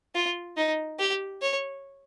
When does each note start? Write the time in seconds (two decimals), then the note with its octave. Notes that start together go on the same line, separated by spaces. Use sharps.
0.15 F4
0.57 D#4
0.99 G4
1.42 C#5